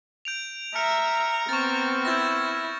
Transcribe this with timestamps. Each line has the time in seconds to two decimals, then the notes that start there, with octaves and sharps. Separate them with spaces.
0.25 G6 D7 F7
0.75 E5 A#5 F6 C#7 F7
1.49 B3 C4 C#6 F6 A6
2.05 E4 G6 A6 A#6